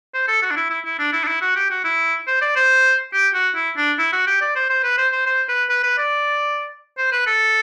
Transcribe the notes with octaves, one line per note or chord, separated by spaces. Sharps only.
C5
A4
F#4
D4
E4
E4
E4
D4
E4
D4
E4
F#4
G4
F#4
E4
C5
D5
C5
G4
F#4
E4
D4
E4
F#4
G4
D5
C5
C5
B4
C5
C5
C5
B4
B4
B4
D5
C5
B4
A4